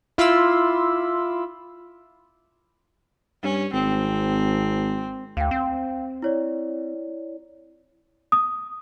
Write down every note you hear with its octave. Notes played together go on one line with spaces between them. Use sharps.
E4 F4 B5 C6 D6 E6
G2 C#4
G#1 C4
D2 F5 G5
C4
E4 C#5 D5
D#6